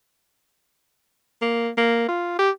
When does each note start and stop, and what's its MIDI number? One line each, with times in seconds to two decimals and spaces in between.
1.41 1.70 58
1.77 2.06 58
2.08 2.36 65
2.39 2.50 67